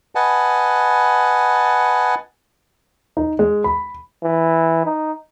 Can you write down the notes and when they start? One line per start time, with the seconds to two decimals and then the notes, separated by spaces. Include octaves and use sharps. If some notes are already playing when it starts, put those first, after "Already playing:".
0.15 B4 D#5 F#5 G#5 A5
3.17 D#4
3.39 G#3
3.64 B5
4.24 E3
4.86 D#4